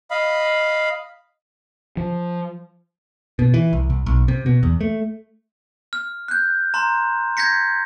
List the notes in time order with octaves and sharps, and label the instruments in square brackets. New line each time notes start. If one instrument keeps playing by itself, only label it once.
[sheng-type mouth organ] D#5 F5 B5
[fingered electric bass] F3
[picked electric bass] B2
E3
C2
C2
B1
C3
B2
E2
A3
[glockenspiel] F6
F#6 G6
A#5 C6
G6 G#6 A#6 B6 C#7